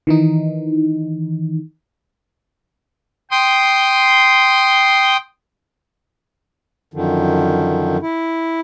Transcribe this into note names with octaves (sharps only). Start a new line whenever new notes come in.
D#3 E3 D#4
G5 C6 D#6
F#2 D3 D#3 F3
E4